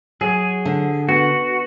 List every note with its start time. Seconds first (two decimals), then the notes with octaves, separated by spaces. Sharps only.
0.21 F#3 G#4
0.65 D3
1.08 B3 F#4